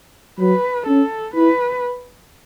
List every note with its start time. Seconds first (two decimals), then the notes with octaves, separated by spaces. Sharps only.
0.39 F#3 B4
0.87 C#4 A4
1.35 E4 B4